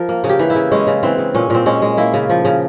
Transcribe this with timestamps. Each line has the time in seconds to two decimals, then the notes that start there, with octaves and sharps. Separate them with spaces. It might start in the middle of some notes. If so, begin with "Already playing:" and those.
Already playing: F3 A#4
0.09 A#3
0.24 C#3
0.29 G4
0.39 E3
0.50 E4
0.56 C#3
0.71 G#3 C#4
0.87 C#3
1.03 E3 C4
1.18 C#3
1.35 A#2 C#4
1.50 A#2 C4
1.66 G#3 C#4
1.82 G#3
1.97 A#3 E4
2.14 C#3
2.30 F3
2.45 C#3